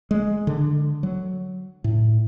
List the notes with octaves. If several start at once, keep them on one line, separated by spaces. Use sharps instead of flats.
G#3
D3
F#3
A2